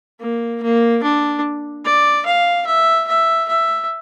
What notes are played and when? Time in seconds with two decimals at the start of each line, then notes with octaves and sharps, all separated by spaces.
0.20 A#3
0.62 A#3
1.03 D4
1.85 D5
2.25 F5
2.66 E5
3.08 E5
3.48 E5